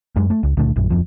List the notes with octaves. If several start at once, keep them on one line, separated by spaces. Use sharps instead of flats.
F#2 G#3
A3
C#2
C#2 A#2 D3 A3
A#1 F#2
D1 F2 F3